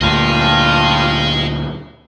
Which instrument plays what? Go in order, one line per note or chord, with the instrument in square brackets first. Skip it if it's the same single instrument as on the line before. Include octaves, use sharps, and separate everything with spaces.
[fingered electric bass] D2 A#2 [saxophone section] G2 F4 [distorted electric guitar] D#5 G#5